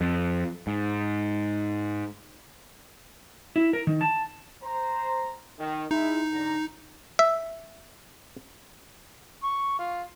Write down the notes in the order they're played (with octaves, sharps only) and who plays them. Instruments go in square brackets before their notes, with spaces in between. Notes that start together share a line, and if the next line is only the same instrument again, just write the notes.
[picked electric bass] F2
G#2
[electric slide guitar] E4
A#4
D#3
A5
[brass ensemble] C5 A#5
D#3
[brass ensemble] G#3 E4 [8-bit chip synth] D#4
[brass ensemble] G#2 D3 A#5
[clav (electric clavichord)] E5
[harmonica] C#6
F4